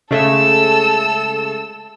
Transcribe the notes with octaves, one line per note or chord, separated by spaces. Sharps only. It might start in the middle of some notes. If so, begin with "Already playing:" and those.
C#3 G#3 A3 A4 E6